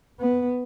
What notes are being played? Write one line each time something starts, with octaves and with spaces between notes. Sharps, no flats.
B3